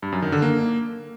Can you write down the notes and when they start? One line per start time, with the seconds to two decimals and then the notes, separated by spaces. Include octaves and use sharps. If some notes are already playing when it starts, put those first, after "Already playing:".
0.02 G2
0.12 F#2
0.22 D#3
0.32 D3
0.42 A#3